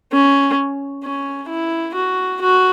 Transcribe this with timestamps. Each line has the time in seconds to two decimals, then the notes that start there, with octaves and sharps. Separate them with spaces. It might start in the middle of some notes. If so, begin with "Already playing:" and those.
0.12 C#4
1.04 C#4
1.49 E4
1.95 F#4
2.41 F#4